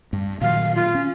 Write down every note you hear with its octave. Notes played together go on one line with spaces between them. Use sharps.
G2
A#2 D#3 F#3 F5
F4
C#4